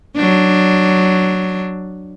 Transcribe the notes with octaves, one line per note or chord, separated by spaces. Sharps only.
F#3 D4